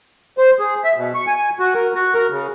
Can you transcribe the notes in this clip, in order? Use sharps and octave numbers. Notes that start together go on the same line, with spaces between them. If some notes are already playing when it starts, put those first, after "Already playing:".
C5
G#4
E5
B2
C#6
G#5
F#4
A#4
F#4
A#4
C#3